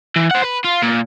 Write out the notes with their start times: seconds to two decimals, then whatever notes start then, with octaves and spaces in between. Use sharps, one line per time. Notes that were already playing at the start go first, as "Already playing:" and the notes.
0.16 E3
0.31 C5 F#5
0.44 B4
0.64 F4
0.82 A#2